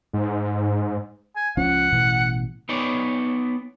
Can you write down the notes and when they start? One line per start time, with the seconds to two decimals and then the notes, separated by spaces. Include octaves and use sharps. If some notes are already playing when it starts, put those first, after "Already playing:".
0.13 G#2
1.36 G#5
1.57 C#2 F3 C#4 F#5
1.92 A1 B2 E3
2.69 B3 D#4 C#5 D5